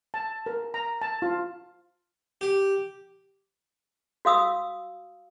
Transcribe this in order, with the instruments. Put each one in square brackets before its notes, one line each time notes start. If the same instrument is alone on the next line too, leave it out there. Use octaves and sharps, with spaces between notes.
[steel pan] A5
A#4
A#5
A5
F4
[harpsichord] G4
[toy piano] F#4 F5 D#6 E6